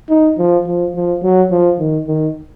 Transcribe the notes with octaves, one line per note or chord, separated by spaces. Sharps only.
D#4
F3
F3
F3
F#3
F3
D#3
D#3